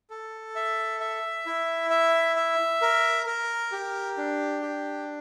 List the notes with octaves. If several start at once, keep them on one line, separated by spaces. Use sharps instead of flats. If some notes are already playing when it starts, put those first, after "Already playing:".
A4
E5
E5
E4
E5
E5
A#4
A#4
G4
D4
G4